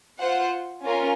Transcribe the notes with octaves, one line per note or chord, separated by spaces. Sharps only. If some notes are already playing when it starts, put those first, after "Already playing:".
F4 C5 F#5
C#4 F4 A#4